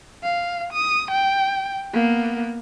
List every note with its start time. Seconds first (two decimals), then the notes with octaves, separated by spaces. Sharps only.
0.23 F5
0.73 D#6
1.11 G5
1.93 A#3 B3